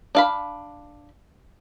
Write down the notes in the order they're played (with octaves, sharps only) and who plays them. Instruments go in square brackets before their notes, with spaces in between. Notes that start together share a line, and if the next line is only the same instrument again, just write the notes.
[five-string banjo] D4 F5 B5